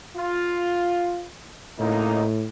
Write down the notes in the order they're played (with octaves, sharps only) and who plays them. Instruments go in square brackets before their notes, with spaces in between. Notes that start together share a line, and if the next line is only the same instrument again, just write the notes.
[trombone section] F4
[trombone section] C#2 A#3 D#4 [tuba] A2